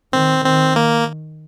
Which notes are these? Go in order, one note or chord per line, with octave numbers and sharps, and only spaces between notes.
D#3 C4
D#3 C4
A#3